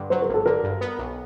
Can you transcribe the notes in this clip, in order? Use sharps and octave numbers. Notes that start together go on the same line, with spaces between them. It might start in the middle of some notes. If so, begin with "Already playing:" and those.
Already playing: G2 D3
F#3 C5
A#4
G#1
A4
D3 A#4
G2
B3
B1